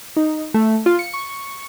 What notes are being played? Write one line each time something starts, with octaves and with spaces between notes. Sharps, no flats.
D#4
A3
F4
C#7
C#6